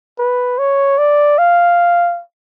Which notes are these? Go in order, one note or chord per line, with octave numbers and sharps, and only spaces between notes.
B4
C#5
D5
F5